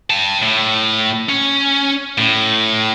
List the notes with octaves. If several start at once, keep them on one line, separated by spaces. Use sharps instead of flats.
G5 A5
A2
C#4
A2